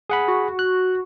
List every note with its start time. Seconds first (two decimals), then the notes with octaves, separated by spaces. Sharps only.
0.10 G#4 F#5 B5
0.28 F#4
0.59 F#6